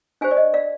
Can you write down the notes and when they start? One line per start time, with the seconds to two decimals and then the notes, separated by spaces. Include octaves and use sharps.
0.21 D4 G4 C5 F5 G#5
0.31 D5
0.37 D#5
0.54 D5 F5